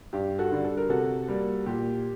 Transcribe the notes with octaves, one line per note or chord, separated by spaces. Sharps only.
G2 G4
F#4 A4
D3 G3
A4
A#4
C3 F#4 A4
G3 A#3
A#2 G4